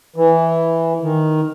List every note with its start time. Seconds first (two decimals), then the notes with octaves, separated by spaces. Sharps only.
0.16 E3
1.02 D#3